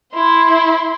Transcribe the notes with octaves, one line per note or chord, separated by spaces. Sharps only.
E4 C6